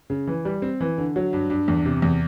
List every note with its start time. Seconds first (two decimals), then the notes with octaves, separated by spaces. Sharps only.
0.10 C#3
0.27 E3
0.45 G3
0.62 C4
0.80 E3
0.98 D3
1.16 F#3
1.33 G2
1.50 G2
1.68 E2
1.85 C3
2.02 E2